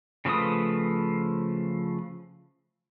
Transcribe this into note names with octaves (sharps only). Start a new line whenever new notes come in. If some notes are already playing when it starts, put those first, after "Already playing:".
C#3 F3 A3 B4 D#6